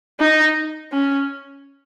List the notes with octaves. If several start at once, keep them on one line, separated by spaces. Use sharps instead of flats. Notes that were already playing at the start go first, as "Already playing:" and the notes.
D#4
C#4